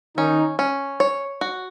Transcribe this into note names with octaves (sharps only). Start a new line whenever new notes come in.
D#3 C#4 D#4
C#4
C#5
F#4